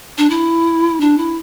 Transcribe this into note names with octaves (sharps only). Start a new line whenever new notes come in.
D4
E4
D4
E4